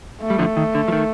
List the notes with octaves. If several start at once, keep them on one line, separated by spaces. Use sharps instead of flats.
A3
G3
D3 F3
D#3
D3
F3
D#3